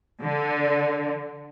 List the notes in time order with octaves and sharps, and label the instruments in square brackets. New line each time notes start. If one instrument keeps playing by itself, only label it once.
[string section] D3